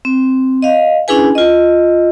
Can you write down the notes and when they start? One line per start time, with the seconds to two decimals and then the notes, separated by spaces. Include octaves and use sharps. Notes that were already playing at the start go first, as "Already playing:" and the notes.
0.05 C4
0.62 D#5 F5
1.08 C#4 D4 E4 G#4 B4 G#5
1.35 F4 D#5